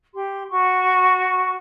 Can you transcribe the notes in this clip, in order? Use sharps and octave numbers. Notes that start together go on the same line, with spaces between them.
G4 C6
F#4 C#6